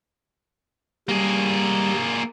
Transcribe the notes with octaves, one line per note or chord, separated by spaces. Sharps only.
G3 A#3 G#4